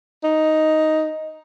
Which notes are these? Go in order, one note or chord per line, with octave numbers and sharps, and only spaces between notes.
D#4